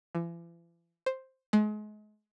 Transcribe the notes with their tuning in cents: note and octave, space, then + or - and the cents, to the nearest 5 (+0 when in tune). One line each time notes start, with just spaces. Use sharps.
E3 +45
C5 +5
G#3 +35